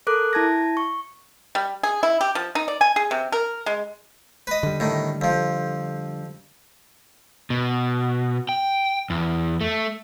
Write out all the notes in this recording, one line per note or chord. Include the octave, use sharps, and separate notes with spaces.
A4 A#4 D6 F#6
E4 A5 G#6 A#6
C#6
G3
G#4
E4
G4
F3
D#4
D5
G#5
G#4
C3
A#4
G#3
B4 D#5
D3 G3
A2 D#3
F2 F3
B2
G5
E2
A3